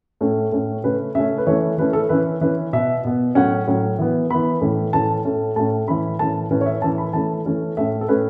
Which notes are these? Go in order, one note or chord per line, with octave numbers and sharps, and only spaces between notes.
A2 A3 C#4
A2 A3 C#4
C#3 A3 C#4 B4
C#3 A3 C#4 E5
B4
E3 A3 C#4 C#5
E3 A3 C#4 B4
A4
E3 C#4 B4
E3 C#4 B4
B2 B3 E5
B2 B3
A2 F#3 C#4 F#5
A2 F#3 C#4
E3 B3
E3 B3 B5
A2 E3 A3 C#4
A2 E3 A3 C#4 A5
A2 A3 C#4
A2 A3 C#4 A5
A2 E3 C#4 B5
A2 E3 C#4 A5
A2 E3 C#4 B4
C#5
E5
A2 E3 C#4 A5
B5
E3 A3 C#4 A5
E3 A3 C#4
A2 A3 C#4 E5
A4
A2 A3 C#4 B4